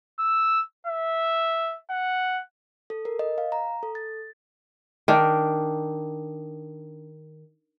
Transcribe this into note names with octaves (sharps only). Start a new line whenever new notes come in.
E6
E5
F#5
A4
A#4
D#5
F5
A#5
A4
A6
D#3 D4